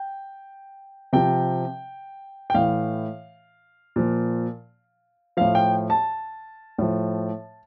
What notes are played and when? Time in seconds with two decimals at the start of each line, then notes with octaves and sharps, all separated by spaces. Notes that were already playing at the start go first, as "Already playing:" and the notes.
Already playing: G5
1.13 C3 F3 G5
2.50 G5
2.54 A2 E3 F5
3.96 A#2 F3
5.37 A2 F3 F5
5.55 G5
5.90 A5
6.78 A2 F3